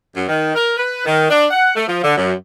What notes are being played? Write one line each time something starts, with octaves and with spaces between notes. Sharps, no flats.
F#2
D#3
A#4
B4
D#3
D4
F#5
A3
F3
D3
F#2